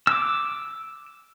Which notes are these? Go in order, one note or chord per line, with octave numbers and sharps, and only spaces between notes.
D6 E6